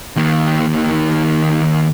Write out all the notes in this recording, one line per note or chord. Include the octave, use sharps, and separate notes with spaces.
D#2 D#3